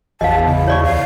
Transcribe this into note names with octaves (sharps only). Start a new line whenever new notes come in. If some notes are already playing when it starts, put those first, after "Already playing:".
G#1 E2 D#5 F5 A5
C#3 E4
C#5 D5 C#6
D2 F5